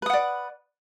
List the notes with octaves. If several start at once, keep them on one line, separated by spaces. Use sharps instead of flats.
B4 D5 F#5 D#6